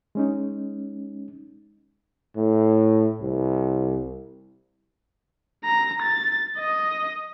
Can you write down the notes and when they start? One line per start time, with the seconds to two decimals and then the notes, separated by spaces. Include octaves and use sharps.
0.15 G#3 C#4 D#4
2.37 A2
3.22 C2
5.65 A#5
6.02 A6
6.58 D#5